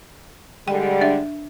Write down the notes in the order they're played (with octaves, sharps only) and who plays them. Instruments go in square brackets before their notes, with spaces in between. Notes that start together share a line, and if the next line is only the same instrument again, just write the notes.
[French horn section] D3 G3 G#3 [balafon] G5
[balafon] D4 E5